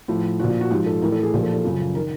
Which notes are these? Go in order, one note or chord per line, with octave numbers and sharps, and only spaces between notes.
A2 F3
A#2 F3 F#4
F4
F#4
G#2 F3 G4
A4
A2 E3 A#4
A4
G#4
A#2 F3 G4
A4
A4
F#2 C#3 F3
D#3 A#4